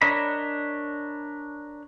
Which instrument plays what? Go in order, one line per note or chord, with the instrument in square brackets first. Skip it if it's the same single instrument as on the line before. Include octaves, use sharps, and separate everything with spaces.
[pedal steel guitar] D4 A#4 C#5 D#5 B5